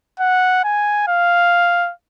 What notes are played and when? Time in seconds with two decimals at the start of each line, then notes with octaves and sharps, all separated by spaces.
0.20 F#5
0.64 G#5
1.08 F5